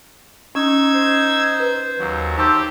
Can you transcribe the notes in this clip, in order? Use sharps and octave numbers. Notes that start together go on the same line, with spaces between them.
C#4 D#4 E6 G#6
C5
B4
D#2 F#3
D#4 G4 C5 A5 E6 G6